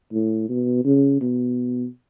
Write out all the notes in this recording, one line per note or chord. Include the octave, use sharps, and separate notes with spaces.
A2
B2
C#3
B2